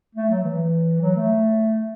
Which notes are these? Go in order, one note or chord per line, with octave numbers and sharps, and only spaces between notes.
A3
F#3
E3
F#3
A3